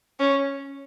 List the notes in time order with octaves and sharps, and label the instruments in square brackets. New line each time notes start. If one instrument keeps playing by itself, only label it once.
[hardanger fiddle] C#4